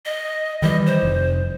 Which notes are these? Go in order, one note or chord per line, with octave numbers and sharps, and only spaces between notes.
D#5
D#3 E3 G3 D#5
C5
F1